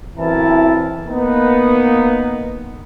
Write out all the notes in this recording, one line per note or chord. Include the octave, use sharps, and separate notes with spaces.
B1 E3 C4 E4 A#4 A5
A#3 B3 D#4